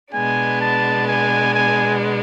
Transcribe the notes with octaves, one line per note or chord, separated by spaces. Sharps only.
B2 G#3 B3 D4 G#5
A5
G#5
G#5